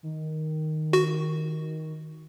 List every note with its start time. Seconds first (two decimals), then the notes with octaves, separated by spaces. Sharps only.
0.03 D#3
0.93 F#4